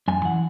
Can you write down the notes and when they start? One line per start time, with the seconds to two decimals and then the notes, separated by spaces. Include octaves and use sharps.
0.08 F#2 G#5
0.25 E3 F#5